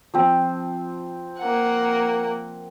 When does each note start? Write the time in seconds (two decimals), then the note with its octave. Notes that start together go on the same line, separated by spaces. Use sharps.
0.14 F3 C4
1.39 A#3 F#5